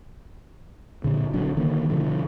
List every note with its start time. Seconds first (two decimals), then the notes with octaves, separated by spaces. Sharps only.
1.04 A#2 D3
1.34 A#1 D3 F#3 D4
1.57 D3 D#3 A#3
1.89 G2 B2 D3 F3